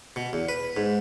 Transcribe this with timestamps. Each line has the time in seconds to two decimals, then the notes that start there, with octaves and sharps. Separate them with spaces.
0.16 B2
0.33 E2
0.49 B4
0.77 G#2